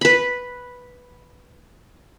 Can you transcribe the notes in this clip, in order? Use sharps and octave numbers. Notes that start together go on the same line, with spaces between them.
B4 B5